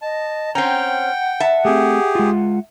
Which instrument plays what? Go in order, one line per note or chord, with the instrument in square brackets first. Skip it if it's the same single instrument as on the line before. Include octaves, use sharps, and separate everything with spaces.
[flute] D#5 [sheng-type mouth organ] A5
[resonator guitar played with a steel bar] C4 C#4 [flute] F#5 [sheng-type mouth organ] G5 [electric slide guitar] A#5
[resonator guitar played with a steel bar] E5 A5
[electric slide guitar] A3 C4 [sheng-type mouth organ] G4 G#4
[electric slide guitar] G#3 F4